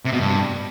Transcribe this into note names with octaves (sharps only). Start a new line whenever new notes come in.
C3
B2
G2